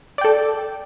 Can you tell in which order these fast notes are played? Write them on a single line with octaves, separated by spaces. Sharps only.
D5 G5 A4